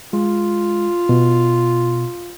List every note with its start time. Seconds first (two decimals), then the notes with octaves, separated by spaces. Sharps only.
0.13 G#3 F4
1.09 B2